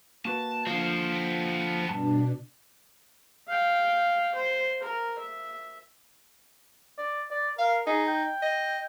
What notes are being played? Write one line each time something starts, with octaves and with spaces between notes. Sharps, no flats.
A#3 F#4 B4 A5
D3 F3 A#3 F#4 C5
B3 C4
G2 B2 D4 A5
F5 G5
C5
A#4
E5
D5
D5
A#4 F5
D#4 G#4
G5
D#5